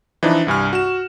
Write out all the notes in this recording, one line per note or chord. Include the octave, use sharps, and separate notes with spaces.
E3 F3 D4 D#4
C2 G2 G#5 F6
F#4 E7